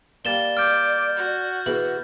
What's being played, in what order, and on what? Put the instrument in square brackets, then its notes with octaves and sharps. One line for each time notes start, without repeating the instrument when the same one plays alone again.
[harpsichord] G3 A#3 D4 [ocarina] D5 [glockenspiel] A6 E7 G7
[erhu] D6 [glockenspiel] F6 G6
[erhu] F#4
[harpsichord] B2 E3 E5 [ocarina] G#4 [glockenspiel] F#7